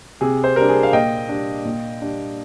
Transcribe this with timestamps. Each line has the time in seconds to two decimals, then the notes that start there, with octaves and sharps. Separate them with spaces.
0.21 C3 G#4
0.44 C5
0.56 G3 D4 A#4
0.69 G#4
0.83 F5
0.93 A#2 D#5 G5
1.29 G3 D4
1.65 A#2
2.01 G3 D4